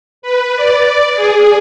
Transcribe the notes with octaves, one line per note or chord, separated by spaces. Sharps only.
B4
D5
G#4